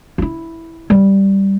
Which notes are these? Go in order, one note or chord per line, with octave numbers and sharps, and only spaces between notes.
E4 F4
G3